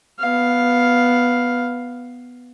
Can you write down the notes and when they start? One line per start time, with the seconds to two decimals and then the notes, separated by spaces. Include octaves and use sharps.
0.19 B3 F5